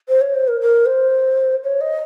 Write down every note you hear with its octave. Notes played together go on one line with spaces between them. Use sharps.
C5
C#5
C5
A#4
A#4
C5
C#5
D#5